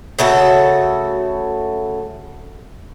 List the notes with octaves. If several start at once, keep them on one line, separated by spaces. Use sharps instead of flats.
C#3 A3 F#4 A4